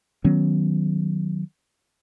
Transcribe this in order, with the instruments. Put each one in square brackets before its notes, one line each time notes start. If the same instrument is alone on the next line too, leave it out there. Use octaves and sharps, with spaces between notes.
[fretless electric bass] D#3 F#3 B3 C#4